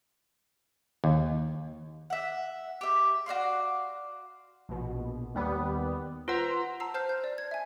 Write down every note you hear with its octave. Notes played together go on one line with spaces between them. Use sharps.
D#2
E5 F#5
G4 E5
F#4 D5 F5 C6
A#1 B2
D#2 G3 B3
F4 B4 C5 F#5 A#5
A5 A#5 E6 C7
C5 A5 F6 G6 C7
G6
D5
G#6
E5 G#5